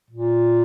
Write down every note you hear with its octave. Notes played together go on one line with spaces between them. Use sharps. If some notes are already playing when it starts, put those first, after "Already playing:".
A#2